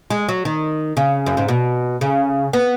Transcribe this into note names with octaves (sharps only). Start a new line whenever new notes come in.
G#3
F#3
D#3
C#3
F#2
G#2
B2
C#3
B3